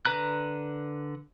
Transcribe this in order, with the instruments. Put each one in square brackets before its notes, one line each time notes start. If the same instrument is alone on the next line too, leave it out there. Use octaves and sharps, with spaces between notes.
[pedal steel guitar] D3 B4 A#5 F#6